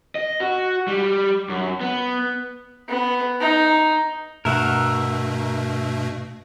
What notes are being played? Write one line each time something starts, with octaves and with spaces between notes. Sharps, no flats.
D#5
F#4
G3
F#2
B3
B3
D#4
G2 B2 A3 A#4 E5 F#5